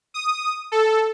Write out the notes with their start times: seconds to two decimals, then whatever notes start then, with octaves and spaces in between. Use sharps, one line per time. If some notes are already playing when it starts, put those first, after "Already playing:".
0.14 D#6
0.72 A4